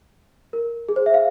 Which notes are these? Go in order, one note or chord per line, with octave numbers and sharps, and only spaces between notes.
A#4
G#4
C5
E5
F5